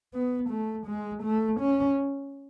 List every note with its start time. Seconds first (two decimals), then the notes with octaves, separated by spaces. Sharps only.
0.14 B3
0.50 A3
0.87 G#3
1.23 A3
1.60 C#4